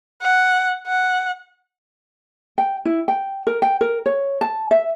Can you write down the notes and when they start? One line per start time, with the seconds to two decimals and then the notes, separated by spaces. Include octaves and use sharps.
0.22 F#5
0.87 F#5
2.58 G5
2.85 E4
3.08 G5
3.47 A#4
3.62 G5
3.81 A#4
4.06 C#5
4.41 A5
4.71 E5